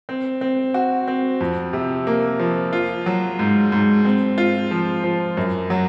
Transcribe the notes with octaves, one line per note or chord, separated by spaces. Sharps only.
C4
C4
F#4
C4
F2
C3
A#3
F3
F4
F#3
G#2
G#2
C4
F4
F3
F3
F#2
F#3